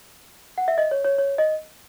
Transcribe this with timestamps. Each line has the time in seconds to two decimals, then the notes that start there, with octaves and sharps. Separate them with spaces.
0.58 F#5
0.68 E5
0.78 D#5
0.91 C#5
1.05 C#5
1.18 C#5
1.38 D#5